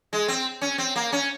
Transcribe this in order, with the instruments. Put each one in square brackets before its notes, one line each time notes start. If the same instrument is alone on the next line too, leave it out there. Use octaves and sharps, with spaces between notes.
[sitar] G#3
C4
C#4
C4
A#3
C#4